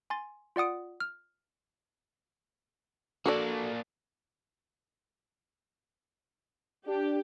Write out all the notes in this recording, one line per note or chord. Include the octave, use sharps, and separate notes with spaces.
G#5 C6 A6
F4 D5 F#5 D#6 D7
F6
A#3 D4 F#4 A4 D5
D4 G4